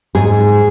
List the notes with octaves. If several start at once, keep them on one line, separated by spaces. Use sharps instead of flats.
G#2 G#4